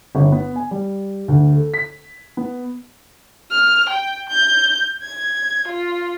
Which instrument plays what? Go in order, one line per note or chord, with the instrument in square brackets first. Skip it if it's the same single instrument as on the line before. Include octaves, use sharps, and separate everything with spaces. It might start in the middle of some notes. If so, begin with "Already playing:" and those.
[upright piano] G1
B3
G#5
G3
D2
A4
B6
B3
[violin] F6
G5
G6
G#6
F4